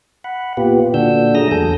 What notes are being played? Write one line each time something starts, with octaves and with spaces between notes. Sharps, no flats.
F#5 B5
A#2 B3 F4 G4
A#2 D3 D4 F#4 E6 G6
F#3 A3 G#4 A#5 D#6 A#6
E2 A4 G#5 G6